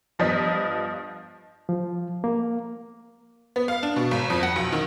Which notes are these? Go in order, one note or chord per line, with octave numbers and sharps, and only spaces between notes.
G2 F3 B3 D#5 B6
F3
A#3
B3
F5
D4
B2
G#1
F2
F#5
B1
D#3